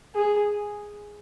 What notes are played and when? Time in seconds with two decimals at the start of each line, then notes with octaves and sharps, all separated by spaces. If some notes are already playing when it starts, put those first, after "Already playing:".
0.15 G#4